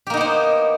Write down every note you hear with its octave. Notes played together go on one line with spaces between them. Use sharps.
A#3 B3 D#4 G4 C5